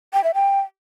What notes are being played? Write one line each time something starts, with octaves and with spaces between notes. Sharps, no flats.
G5
E5
G5